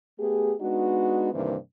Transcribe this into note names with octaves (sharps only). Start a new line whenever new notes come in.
A3 B3 G4 G#4
G#3 B3 D4 D#4 F#4
G2 C3 D#3 E3 A#3 C4